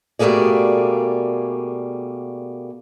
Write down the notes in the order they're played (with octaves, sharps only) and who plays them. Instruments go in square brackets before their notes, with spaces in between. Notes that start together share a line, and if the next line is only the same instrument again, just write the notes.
[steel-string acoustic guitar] B2 G3 A3 A#3 G#4 D5